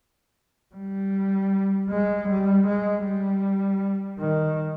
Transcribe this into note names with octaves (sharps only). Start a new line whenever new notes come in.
G3
G#3
G3
G#3
G3
D#3